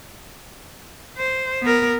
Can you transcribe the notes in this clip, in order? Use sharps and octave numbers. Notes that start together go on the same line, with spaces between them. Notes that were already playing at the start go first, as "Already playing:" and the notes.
C5
B3 A#4